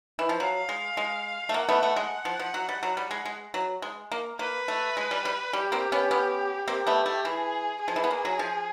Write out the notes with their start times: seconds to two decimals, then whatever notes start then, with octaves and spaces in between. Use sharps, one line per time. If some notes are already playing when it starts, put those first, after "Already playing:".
0.19 E3
0.29 F3
0.40 F#3 F5
0.69 G#3
0.97 G#3
1.49 A3
1.54 A#3 F#5
1.69 A3 B3
1.83 A3
1.96 G#3
2.25 F3
2.39 F3
2.54 F#3
2.69 G3
2.83 F#3
2.97 G3
3.11 G#3
3.25 G#3
3.54 F#3
3.82 G#3
4.12 A#3
4.39 A#3 B4
4.68 A3
4.97 G#3
5.11 G3
5.25 G3
5.53 G3 G4
5.72 A#3 C4
5.92 B3 C#4
6.11 B3 C#4
6.68 A#3 C4 G4
6.87 A3 B3
7.06 A3
7.25 E3 G#4
7.81 G#4
7.88 F3
7.96 E3
8.04 B3
8.11 A#3
8.25 F#3
8.39 F3